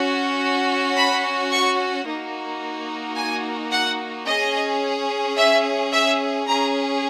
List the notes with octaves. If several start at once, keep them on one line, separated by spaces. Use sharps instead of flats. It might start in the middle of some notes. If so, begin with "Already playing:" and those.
Already playing: C#4 F#4
B5
C#6
A#3 D#4 F#4
G#5
F#5
C#4 G#4 D#5
E5
E5
C#4 G#4 A#5